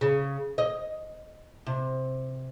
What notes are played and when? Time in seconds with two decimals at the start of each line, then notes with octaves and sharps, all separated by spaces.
0.01 C#3
0.58 D#5
1.66 C3